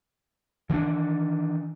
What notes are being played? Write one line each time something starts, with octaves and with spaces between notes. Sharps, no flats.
D#3 E3 A3 D4